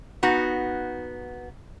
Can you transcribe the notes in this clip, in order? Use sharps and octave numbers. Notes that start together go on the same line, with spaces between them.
B3 D#4 F#4 F#5